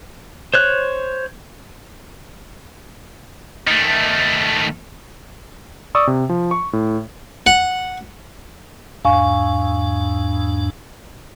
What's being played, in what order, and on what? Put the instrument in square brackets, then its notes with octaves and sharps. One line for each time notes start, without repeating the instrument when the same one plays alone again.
[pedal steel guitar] C5 C#5 F#6
[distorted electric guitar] D#3 A3
[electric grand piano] D5 C#6 D#6 E6
C3
F3
C#6
A2
[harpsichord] F#5
[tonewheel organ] E2 G#2 D4 [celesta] F5 G#5 C#6